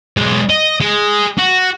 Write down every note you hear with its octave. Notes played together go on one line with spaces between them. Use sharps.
B1 G#3
D#5
G#3
F#4